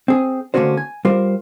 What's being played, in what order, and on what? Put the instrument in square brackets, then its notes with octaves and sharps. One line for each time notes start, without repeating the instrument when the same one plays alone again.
[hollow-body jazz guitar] C4 G#4
D3 A3 A#3 C#4 F#4 C5
G#5
G3 F4 A#4 C5